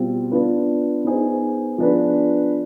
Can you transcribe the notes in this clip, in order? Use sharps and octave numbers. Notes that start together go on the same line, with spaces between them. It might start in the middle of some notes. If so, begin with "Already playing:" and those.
Already playing: B2 G3 C4 F4
B3 D4 F4 B4
B3 D#4 G#4 C5
F3 B3 D4 G#4 B4